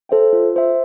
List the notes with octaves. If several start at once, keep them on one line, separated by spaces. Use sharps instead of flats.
A4 C5 E5 G5
F4
C5 E5